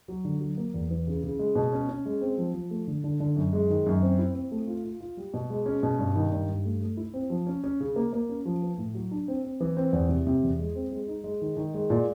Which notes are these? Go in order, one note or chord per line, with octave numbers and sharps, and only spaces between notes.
F#3
D3
F#3
A#3
E2
E3
C#3
C#3
G#3
B2
C#4
C#4
G#3
C4
F3
F3
A3
D3
D3
D3
F#2
G#3
D#3
F#2
C4
E4
C4
A3
F4
F4
F4
G3
B2
G#3
C#4
B2
G2
D#3
G2
G2
A3
A3
E4
C4
F3
C#4
C#4
C#3
A#3
A#3
C#4
F3
B3
A2
F#3
D4
C4
C4
E3
C4
E2
C3
C3
E2
G#3
C4
G#3
D#4
G#3
D#3
D#3
G#3
A#2